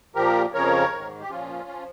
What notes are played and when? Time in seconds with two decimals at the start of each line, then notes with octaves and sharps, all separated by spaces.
0.15 A#2 F3 G4 A#4
0.54 F2 C#3 F3 A#4 C#5
0.93 G#2 D#3
1.21 G4
1.30 A#2 F3 C#4 F4
1.69 F3